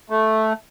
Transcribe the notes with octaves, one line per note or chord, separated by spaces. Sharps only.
A3